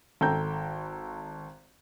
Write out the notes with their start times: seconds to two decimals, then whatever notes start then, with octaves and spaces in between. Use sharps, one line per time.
0.21 G#1 A4 G5 A#5 G6